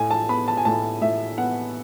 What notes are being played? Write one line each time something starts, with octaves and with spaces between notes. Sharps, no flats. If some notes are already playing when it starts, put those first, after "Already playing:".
Already playing: A2 G#5
A5
B3 B5
A5
G#5
A2 A5
A2 E5
B3 F#5